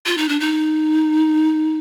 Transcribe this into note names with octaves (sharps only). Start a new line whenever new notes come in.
F4
D#4
D4
D#4